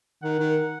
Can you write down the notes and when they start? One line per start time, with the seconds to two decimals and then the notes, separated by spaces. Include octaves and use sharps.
0.23 D#3 F#5
0.39 D#3